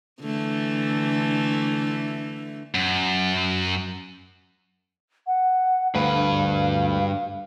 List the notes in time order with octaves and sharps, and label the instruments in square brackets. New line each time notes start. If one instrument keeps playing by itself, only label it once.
[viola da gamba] D3 E3 A3
[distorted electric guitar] F#2
[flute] F#5
[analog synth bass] D2 [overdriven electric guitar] G2 B4 [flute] F5